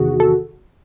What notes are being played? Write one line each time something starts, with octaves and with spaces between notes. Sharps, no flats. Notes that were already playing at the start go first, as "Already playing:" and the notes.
Already playing: E2 C3 D#3 F#4 G#4
A4